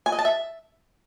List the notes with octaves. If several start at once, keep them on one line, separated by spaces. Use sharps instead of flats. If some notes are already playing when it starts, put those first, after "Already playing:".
G#5
D#5
A5
E5